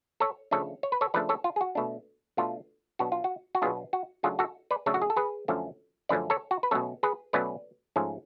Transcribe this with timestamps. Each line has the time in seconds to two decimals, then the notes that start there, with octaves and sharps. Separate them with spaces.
0.20 A4 C#5
0.51 C#3 F3 A3 D4 A4 C#5
0.83 C#5
0.92 B4
1.01 A4 C#5
1.14 C#3 F3 A3 D4 B4 D5
1.29 A4 C#5
1.44 F4
1.56 G#4
1.61 F#4
1.75 B2 A3 D4
2.37 B2 A3 D4 F4
2.99 B2 F#3 B3 D4 F#4
3.12 F4
3.24 F#4
3.55 F#4
3.62 B2 F#3 B3 D4 F4 G#4
3.93 F#4
4.23 C#3 F#3 A3 D4 F4 G#4
4.39 F#4 A4
4.71 B4 D5
4.86 C#3 F#3 A3 D4 A4 C#5
4.94 F#4
5.02 G#4
5.10 A4
5.16 G#4 B4
5.48 F#2 D3 F3 A3 C#4
6.09 F#2 D3 F3 A3 C#4 B4 D5
6.30 A4 C#5
6.51 F#4
6.63 B4
6.71 B2 F#3 A3 C#4 A4 C#5
7.03 G#4 B4
7.33 B2 F#3 A3 C#4 B4 D5
7.96 G#2 F3 A3 C#4